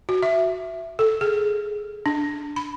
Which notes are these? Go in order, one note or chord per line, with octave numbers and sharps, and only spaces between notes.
F#4
E5
A4
G#4
D4
B5